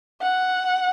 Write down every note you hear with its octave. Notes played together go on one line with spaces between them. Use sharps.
F#5